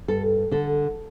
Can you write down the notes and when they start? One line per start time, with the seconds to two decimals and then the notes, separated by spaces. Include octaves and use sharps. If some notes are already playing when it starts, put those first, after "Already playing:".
0.08 G2 A4
0.51 D3 A4